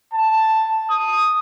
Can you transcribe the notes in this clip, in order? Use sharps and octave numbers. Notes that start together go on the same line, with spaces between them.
A5
D#6